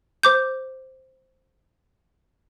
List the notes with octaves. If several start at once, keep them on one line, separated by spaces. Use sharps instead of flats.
C5 D6 G6